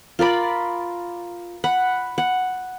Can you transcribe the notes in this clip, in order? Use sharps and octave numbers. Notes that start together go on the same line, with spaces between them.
F4 A#4 D5 B5
F#5 B5
F#5